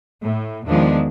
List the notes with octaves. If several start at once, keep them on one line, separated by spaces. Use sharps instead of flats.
A2
E2 D#3 F3 G#3 D4